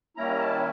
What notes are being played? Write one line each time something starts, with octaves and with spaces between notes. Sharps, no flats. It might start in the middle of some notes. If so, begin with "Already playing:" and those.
D#3 G3 A#3 C#4 E4 A#5
A5